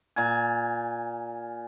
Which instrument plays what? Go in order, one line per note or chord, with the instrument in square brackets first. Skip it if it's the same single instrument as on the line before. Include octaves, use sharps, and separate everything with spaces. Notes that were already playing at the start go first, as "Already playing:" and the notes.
[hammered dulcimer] A#2 G#5